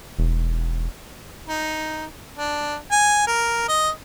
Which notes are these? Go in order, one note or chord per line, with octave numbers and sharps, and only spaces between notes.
E1
D#4
D4
G#5
A#4
D#5